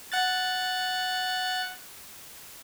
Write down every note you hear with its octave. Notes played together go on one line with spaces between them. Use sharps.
F#5 F#6 A6